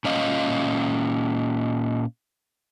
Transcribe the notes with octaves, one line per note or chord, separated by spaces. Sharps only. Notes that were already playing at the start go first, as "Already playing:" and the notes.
A#2 C#4 D#5 F5